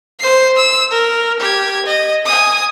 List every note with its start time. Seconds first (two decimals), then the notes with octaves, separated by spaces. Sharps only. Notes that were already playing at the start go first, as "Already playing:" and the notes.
0.20 C5 C7
0.56 E6
0.91 A#4
1.40 G4 G#6
1.86 D#5
2.25 G#5 D#6